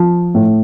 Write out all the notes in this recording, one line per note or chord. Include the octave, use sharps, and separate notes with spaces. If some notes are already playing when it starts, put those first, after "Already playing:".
Already playing: F3
A2